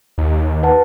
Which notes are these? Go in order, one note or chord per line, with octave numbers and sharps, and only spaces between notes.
D#2
B4 F#5 A5